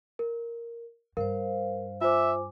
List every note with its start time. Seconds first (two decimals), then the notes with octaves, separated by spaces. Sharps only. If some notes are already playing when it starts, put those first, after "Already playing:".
0.19 A#4
1.17 G2 A#4 C5 F5
2.01 F4 C5 E5 G#5 D6